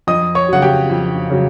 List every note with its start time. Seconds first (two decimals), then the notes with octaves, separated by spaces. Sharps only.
0.07 F2 D#5 D#6
0.35 C#5 C#6
0.48 C#3 F#3 F#5
0.62 G4 G5
0.90 F2
1.30 C#3 F#3